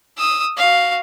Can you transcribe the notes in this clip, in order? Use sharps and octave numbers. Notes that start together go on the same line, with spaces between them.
D#6 E6
F#4 F5